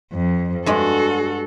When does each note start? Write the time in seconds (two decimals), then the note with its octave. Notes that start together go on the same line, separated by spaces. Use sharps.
0.13 F2
0.66 G2 G#3 F#4 A4